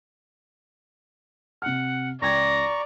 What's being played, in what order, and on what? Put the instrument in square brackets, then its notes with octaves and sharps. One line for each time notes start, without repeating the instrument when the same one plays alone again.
[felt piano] C3 F6 [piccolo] F#5
[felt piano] C#2 G5 G#6 [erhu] D5 [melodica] A#5 C#6 [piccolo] A#6